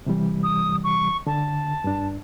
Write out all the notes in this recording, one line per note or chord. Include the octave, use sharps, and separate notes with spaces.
C3 E3 G3
D#6
C#6
D3 A5
G2 D4